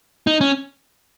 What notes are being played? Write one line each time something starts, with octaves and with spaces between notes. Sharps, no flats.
D#4
C#4